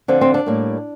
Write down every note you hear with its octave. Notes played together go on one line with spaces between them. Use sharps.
D3 F3 C4
C4
D4
A2 G3 A#3